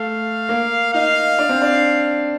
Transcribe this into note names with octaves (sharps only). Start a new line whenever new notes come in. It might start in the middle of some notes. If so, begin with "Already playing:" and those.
Already playing: A3 F5
A#3
D#4 F5
D4
C4
D4